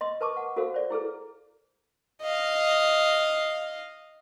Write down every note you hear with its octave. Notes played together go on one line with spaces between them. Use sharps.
D#5 C6
A#4 B4 A5 C#6 D6
F#5
F#4 A4 A#4 C5 F5
C5 D5
E4 G#4 A4 B4
D#5 F5